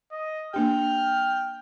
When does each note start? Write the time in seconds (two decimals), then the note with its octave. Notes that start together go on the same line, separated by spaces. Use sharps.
0.11 D#5
0.54 A#3 D4 G4 G5 F6